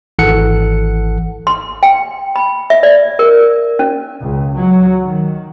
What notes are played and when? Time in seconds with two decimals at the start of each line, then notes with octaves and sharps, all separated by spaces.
0.19 G#1 E3 A4 F#5 C#7
1.47 C6
1.83 G5
2.36 B5
2.70 E5
2.83 D5
3.19 A#4
3.79 C#4
4.23 C#2
4.59 F#3
5.04 D#3